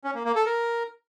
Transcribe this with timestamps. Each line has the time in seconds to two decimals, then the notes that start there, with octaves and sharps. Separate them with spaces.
0.04 C#4
0.15 A#3
0.25 A#3
0.36 A4
0.46 A#4